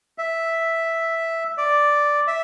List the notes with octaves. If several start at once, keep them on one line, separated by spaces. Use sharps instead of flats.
E5
D5
E5